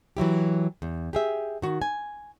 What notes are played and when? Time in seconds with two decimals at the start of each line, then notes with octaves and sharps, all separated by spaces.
0.17 E3 F#3 E4 G4
0.82 E2
1.13 G4 G#4 E5
1.62 D#3 F#4
1.82 G#5